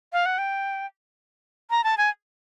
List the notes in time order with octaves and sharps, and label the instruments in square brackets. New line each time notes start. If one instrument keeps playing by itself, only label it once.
[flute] F5
F#5
G5
A#5
A5
G#5